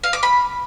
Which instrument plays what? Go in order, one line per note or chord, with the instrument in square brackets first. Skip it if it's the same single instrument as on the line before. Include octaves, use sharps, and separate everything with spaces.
[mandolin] F5
D6
B5